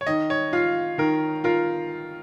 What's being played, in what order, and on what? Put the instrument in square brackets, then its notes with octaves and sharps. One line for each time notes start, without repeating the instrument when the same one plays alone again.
[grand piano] C#5
[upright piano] D#3 [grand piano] D#5
[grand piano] C#5
[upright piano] F4 [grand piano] F5
[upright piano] D#3 [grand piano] A#4
[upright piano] F4 [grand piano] A#4